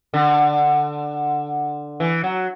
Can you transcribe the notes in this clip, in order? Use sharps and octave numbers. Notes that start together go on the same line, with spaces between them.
D3
E3
F#3